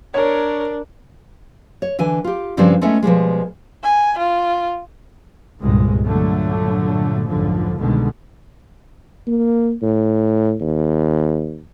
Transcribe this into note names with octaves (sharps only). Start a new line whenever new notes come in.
D4 A#4 C#5
C#5
D3 E3 G#5
F4 G4
G2 C#3 F3 G3 C4 D4
G#3 A3 B3 C#4 E4
B2 F3 G3 G#3
G#5
F4
G1 C2 G2 A#2 G#3
G1 A#2 D3 F#3 A3
F1 B1 G#2 D3 F3
C2 B2 D3 D#3 G#3
A#3
A2
D#2